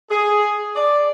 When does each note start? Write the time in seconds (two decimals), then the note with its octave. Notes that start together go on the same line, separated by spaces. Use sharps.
0.11 G#4
0.76 D5